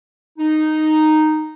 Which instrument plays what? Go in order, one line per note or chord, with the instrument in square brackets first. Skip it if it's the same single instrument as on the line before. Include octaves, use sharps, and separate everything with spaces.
[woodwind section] D#4